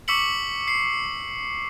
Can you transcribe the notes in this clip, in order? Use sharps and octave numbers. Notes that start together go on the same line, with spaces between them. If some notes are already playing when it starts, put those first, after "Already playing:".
C#6 D6 E6 B6 C#7 F#7
C7